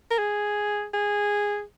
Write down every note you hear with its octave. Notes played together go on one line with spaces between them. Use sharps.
A#4
G#4
G#4